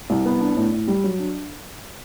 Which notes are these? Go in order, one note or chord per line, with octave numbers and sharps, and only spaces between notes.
C2
B3
D4
A2
A2
G3
F#3
D4